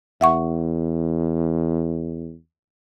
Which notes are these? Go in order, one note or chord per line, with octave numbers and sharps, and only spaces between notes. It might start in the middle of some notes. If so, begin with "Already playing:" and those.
E2 E5 F#5 C#6